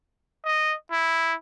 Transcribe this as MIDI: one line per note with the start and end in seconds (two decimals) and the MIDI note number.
0.45 0.75 75
0.91 1.34 64